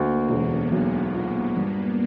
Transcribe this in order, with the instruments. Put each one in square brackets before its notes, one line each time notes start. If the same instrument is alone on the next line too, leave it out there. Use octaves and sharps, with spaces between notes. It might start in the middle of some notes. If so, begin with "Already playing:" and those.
Already playing: [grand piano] D2 [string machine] A#3
[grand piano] E1 [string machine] B3
[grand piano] B1
A#2
G2